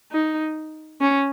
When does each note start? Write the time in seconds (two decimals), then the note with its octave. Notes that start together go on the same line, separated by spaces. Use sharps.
0.11 D#4
1.01 C#4